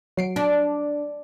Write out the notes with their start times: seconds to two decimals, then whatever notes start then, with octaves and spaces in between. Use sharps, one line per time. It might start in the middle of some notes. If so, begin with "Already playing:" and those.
0.17 F#3 C7 D7
0.36 D4